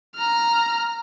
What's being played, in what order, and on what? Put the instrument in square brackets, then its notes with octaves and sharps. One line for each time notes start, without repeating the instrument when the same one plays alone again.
[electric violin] A#5 F6